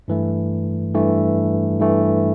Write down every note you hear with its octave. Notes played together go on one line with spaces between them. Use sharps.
G2 E3 A3
G2 E3 A3
G2 E3 A3